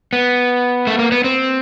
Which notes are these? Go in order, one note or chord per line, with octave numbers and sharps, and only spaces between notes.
B3
A3
A#3
B3
C4